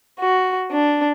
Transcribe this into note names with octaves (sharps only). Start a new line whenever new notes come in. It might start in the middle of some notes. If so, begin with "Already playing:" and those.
F#4
D4